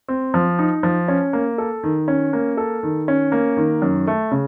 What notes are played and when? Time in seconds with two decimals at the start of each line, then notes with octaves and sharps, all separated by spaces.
0.08 C4
0.34 F3
0.59 D#4
0.83 F3
1.08 C#4
1.33 A#3
1.58 A4
1.83 D#3
2.08 C#4
2.33 A#3
2.57 A4
2.83 D#3
3.08 C#4
3.32 A#3
3.57 D#3
3.82 F#2
4.07 A3
4.31 C#3